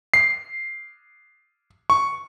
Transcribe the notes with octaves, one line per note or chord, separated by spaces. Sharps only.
C7
C#6